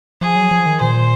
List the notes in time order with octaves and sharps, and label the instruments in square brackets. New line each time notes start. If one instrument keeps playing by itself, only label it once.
[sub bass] F3 [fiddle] G#4
[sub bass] F#3
F3
D#3
[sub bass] A#2 [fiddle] C5